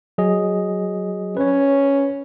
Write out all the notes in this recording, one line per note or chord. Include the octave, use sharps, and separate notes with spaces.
F#3 G#4 D#5
C#4 B4 C#5